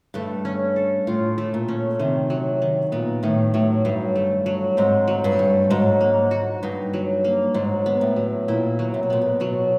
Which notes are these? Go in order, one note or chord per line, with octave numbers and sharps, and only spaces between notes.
G2 A3
C#4
A4
A2 F4
A3
A#2
C#4
C3 D#3
F#3
D#3
A#2 B3
A2 D#3
A2 F#3
G2 F#3
A3
F#3
G#2 C4
F#3
G2
A3
G#2 F#3
A#3
F#4
G2 D#4
F#3
A#3
G#2 F#3
B3
A2
F#3
A#2 E4
F#3
C3
B2
A#2 B3
B2
B2 F#3